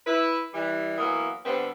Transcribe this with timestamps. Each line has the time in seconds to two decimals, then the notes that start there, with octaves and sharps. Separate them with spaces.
0.06 E4 B4
0.53 E3 G3
0.98 E3 F#3 A#3 B3
1.45 D3 G3 B3 C4